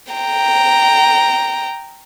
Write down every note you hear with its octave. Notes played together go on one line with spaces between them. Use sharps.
G5 A#5